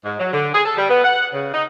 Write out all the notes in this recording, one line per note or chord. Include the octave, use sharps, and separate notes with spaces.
G#2
F#3
D3
G#4
A4
G3
B3
F#5
C#3
D#4